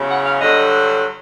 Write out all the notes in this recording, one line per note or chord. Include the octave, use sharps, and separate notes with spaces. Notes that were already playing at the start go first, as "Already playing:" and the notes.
Already playing: E2 C#3 F#3
F#5
F5
G2 D3 F#3 D#5